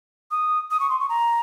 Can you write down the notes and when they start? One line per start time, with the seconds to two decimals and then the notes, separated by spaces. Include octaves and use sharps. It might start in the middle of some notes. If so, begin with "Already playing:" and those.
0.31 D#6
0.71 D#6
0.80 C#6
0.90 C6
1.00 C#6
1.09 A#5